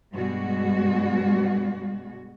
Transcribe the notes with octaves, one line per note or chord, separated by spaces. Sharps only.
G2 B2 G3 G#3 F#4